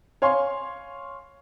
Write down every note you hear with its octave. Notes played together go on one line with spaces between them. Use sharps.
C#5 F5 G#5 C6